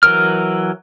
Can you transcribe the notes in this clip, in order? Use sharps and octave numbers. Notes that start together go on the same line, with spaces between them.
E3 F#3 A#4 F6